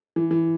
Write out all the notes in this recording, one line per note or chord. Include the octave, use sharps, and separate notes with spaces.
E3
E3